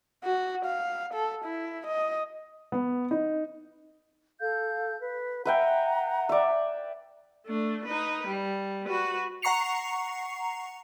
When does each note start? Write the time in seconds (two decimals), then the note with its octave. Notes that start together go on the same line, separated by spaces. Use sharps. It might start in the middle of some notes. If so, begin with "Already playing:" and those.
0.24 F#4
0.66 F5
1.14 A4
1.45 E4
1.87 D#5
2.72 B3
3.11 D#4
4.40 A4 F5 G6
5.01 B4
5.45 B4 E5 F#5 G5 A#5
6.29 D5 E5
7.46 A3 D4
7.85 D#4 B4
8.27 G3
8.87 F#4 B4
9.42 F#5 A#5 C#6 C7 C#7 F7